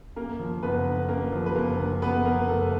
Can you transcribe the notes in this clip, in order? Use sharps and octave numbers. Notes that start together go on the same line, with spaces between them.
F#2 A#3 A#4
F3
F#1 B3 B4
D3
F#2 A#3 A#4
F3
B4
F#1 A#3 A#4
D3
F#2 B3 B4
F3 A#3 A#4
F#1 A3 A4